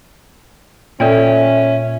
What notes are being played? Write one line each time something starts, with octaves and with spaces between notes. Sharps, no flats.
A#2 C#4 A4 D5 E5 G5